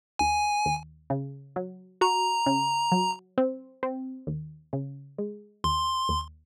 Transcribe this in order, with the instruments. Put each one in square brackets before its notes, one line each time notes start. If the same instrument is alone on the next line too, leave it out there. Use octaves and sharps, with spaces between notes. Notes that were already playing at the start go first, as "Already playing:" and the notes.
[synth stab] D#2 [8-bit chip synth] G#5
[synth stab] D#2
C#3
F#3
[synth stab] F#4 [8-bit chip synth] A#5
[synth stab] C#3
F#3
C4
C4
D#2
C#3
G#3
[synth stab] D#2 [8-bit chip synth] C6
[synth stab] D#2